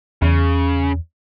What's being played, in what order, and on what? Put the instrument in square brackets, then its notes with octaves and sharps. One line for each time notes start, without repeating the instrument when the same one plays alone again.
[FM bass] E2 [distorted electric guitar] C#3